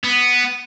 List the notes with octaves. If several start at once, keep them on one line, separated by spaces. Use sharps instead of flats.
B3